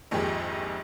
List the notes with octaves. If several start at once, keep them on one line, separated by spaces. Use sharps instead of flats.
A#1 F2 G#2 D#3 G4 G#4